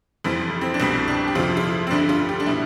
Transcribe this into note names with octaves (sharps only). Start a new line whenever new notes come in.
F1 F2 E3 G3 C4
C4
D4
C2 B2 G3 C4
D4
G4
F2 C3 F3 F4
F4
E4
C4
D2 D3 G3 D4
F4
G4
D4
B2 G3 E4